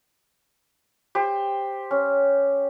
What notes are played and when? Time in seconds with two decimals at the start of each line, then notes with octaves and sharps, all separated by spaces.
1.15 G4 C5
1.91 C#4